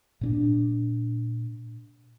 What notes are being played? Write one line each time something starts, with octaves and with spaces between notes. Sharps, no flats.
A#2 C4 D4